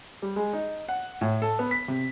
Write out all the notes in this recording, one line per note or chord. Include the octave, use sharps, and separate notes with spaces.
G3
G#3
D#4
F#5
A2
A4
B3
B6
C3